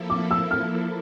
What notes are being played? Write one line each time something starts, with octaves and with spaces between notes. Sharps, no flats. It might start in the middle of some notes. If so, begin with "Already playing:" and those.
Already playing: F3 A#3 E4 A4
D6
E6
F6